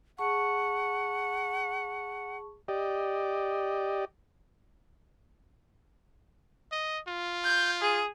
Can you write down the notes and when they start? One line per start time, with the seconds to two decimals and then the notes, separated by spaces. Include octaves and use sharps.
0.18 G#4 F#5 A5 C#6
2.68 G4 D5 D#5
6.72 D#5
7.08 F4
7.44 G6
7.81 G#4